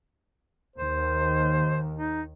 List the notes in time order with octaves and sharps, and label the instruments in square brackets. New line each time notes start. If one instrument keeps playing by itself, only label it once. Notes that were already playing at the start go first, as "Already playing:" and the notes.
[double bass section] D#2 D#3 [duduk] C5
[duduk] D#4